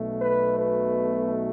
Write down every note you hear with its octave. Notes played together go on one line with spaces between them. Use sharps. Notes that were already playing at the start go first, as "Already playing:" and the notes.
Already playing: B1 B2 A3
B4
B4